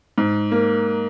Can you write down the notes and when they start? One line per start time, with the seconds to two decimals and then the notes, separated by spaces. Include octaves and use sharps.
0.18 G#2
0.52 A#3